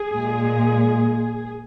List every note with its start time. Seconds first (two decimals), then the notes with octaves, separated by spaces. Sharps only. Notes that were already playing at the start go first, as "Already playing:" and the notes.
Already playing: G#4
0.11 A#2 G#3